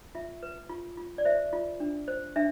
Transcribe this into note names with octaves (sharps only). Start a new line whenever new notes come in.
F4 E5
B4
F4
F4
D5
C5 E5
F4
D4
C5
D4 E5